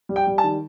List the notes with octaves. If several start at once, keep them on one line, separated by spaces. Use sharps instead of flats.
G3
G5
G3
A5
D#3